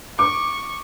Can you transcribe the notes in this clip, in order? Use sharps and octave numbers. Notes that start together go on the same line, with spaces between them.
C#6 D6